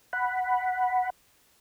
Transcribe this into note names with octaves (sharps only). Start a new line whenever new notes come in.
F#5 B5